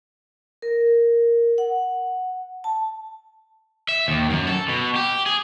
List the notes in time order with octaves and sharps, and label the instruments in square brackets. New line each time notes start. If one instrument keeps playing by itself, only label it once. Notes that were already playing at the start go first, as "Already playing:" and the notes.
[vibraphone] A#4
F#5
A5
[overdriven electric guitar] E5
D#2
F#2
A4
B2
G4
G#4